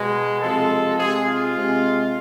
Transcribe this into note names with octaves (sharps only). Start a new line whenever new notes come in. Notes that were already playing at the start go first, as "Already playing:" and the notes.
Already playing: B2 G#3
C3 F3 G#3 A4
C3 G#3 G#4
F4
C3 G#3